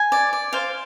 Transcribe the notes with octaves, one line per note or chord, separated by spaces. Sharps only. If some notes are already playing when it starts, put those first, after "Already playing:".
Already playing: G#5
D5
D5
C5 F5